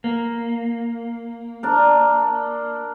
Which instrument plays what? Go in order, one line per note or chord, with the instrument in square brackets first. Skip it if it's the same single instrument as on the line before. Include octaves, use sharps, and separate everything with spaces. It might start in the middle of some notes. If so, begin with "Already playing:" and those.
[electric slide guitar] A#3
[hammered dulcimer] D4 A#4